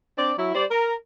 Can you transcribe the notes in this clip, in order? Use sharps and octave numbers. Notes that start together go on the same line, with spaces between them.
C4 D4 D5
F#3 E4
G3 C5 D5
A#4